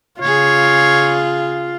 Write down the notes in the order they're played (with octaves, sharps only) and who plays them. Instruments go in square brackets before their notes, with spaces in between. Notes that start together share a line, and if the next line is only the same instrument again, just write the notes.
[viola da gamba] C#3 G#4 [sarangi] F4 [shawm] C#5